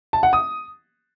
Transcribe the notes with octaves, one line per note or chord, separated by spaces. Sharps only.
A5
F#5
D#6